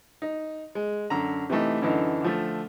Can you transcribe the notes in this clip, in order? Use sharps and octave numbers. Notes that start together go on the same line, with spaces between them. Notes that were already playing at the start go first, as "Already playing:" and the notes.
D#4
G#3
F#2 D3 A#5
C3 E3 A3 D#4
F#2 D3 E3 D#4
D3 F3 A3